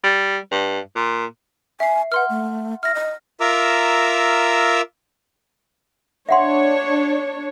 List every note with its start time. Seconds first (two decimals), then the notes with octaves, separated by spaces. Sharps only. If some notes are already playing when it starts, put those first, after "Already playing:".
0.03 G3
0.51 G2
0.95 A#2
1.80 E5 G#5 C7
2.12 B4 F#5 C6 F6
2.30 A3
2.83 E5 F6 A#6
2.95 D#5
3.40 F4 A#4 E5 A#5 D6 E6
6.29 D4 C#5 E5 F#5 C6